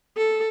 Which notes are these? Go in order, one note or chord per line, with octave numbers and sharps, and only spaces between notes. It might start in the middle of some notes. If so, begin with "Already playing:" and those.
A4